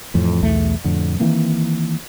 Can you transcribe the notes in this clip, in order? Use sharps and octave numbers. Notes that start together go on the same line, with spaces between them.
F2 A2 E3
B1 E2 A3
F2 A2 D3
D#3 E3 A#3 C4